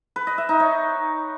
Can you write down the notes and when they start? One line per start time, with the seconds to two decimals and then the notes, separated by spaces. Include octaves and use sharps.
0.16 B4
0.27 D#5
0.38 E5
0.49 D#4
0.60 C#5